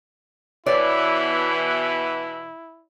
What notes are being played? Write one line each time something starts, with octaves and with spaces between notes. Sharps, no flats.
B2 E3 E4 C#5 D5